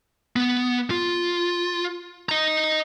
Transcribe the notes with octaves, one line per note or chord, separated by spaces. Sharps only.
B3
F4
D#5 A#5